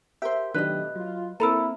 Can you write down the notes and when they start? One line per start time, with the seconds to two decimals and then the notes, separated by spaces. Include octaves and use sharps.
0.22 G4 A#4 C5 E5
0.54 B2 D#3 F#3 A3 D4 G4 B4 D#5
0.96 F#3 F4
1.40 A#3 C4 E4 A4 A#4 A#5 B5 E6